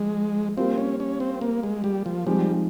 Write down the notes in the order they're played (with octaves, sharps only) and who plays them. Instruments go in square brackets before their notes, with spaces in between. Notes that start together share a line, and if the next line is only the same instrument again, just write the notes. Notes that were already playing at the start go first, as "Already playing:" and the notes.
Already playing: [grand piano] F3 [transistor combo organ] G#3
[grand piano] G3 A#3 F4 [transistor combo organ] C4
[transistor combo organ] C#4
C#4
C4
A#3
G#3
G3
F3
[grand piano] F3 G#3 C4 D#4 [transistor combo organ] G3